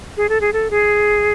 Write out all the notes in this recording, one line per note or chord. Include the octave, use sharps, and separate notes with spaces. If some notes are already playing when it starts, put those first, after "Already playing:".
G#4
A4
G#4
A4
G#4